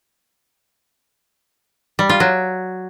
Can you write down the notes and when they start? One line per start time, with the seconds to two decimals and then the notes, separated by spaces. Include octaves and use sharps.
1.99 G3
2.09 F4
2.20 F#3